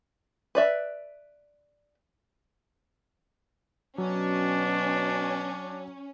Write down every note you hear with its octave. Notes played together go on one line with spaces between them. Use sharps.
B4 D5 E5
B2 F#3 C#4 D4